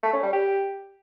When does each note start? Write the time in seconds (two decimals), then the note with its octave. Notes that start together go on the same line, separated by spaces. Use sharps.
0.03 A3
0.13 C#4
0.23 G3
0.33 G4